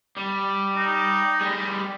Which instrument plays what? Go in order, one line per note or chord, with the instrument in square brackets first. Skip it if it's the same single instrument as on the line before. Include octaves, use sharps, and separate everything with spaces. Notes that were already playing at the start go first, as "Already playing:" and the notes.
[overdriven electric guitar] G3
[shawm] D#4
[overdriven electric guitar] G3 G#4